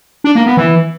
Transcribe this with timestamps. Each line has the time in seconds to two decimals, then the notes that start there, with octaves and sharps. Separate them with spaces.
0.24 D4
0.35 A#3
0.46 B3
0.57 E3